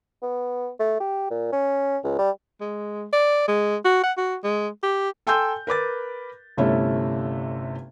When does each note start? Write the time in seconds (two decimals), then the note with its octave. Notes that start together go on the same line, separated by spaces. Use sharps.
0.22 B3
0.79 A3
1.00 G4
1.31 A#2
1.52 C#4
2.04 C#2
2.19 G3
2.61 G#3
3.13 D5
3.48 G#3
3.85 F#4
4.03 F#5
4.17 F#4
4.44 G#3
4.83 G4
5.27 A4 G5 G#5 C6 E6 G6
5.67 A#4 B4 D6 A6
6.57 G1 C3 A3 C#4 E4 E5